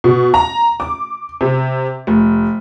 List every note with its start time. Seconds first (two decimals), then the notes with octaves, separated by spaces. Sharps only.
0.04 B2
0.34 A#5
0.80 D6
1.41 C3
2.07 F1